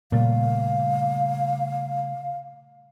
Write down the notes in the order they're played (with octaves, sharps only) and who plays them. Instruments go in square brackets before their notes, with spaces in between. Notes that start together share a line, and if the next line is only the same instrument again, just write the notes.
[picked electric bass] A#2 [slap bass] C#3 G3 A3 [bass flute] F5